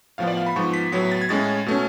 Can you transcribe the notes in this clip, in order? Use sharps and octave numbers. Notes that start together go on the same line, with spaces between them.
A2 F3 B3 F5
D5
F5
B5
G#2 F3 B3 C#6
B6
A2 F#3 B3 B6
A6
G#6
A2 G#3 C#4 A6
B2 A3 C#4